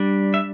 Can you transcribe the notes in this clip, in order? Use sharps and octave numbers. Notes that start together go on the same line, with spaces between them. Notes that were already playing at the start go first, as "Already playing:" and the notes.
Already playing: G3 D4
E5